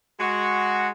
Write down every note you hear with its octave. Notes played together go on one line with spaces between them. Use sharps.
G#3 F#4